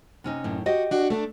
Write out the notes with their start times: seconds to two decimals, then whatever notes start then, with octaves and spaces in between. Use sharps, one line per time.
0.24 C3 C#4 D#4
0.44 F#2 A2
0.66 F#4 G4 D#5
0.91 D4 F#4
1.10 A3 C#4 D4